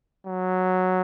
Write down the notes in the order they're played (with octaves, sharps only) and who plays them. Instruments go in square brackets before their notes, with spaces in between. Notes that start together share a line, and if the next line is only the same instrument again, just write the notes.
[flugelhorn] F#3